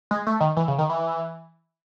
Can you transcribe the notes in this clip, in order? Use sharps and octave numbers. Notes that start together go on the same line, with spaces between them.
G#3
A3
D#3
E3
C#3
D#3
E3